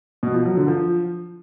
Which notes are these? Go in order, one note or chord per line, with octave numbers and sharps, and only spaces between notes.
B2
F3
F#3
D3
F3